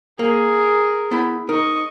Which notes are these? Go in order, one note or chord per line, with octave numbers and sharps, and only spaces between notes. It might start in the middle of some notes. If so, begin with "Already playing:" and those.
A#3 G#4 A#4
B3 E4 B5
D#4 A#4 D#5 C#6